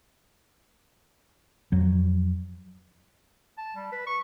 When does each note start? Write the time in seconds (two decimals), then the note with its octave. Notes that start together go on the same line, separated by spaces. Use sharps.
1.72 F2 F#3
3.57 A5
3.76 G3
3.92 B4
4.07 C#6